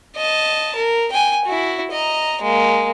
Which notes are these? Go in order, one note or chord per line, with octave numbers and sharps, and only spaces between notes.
D#5 A5
A#4
G5 G#5
E4 F#4
D#5 A#5
G#3 A#3